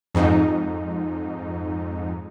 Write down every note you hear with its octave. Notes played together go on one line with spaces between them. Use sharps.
F2 G#2 D#4